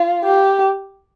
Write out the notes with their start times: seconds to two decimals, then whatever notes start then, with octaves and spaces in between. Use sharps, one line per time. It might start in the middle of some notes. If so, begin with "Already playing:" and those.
Already playing: F4
0.24 G4